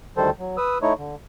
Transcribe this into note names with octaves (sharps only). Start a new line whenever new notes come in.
D2 D#3 G3 A4 C5
F#3
B4 D#6 E6
A3 D#4 E4 C#5
D3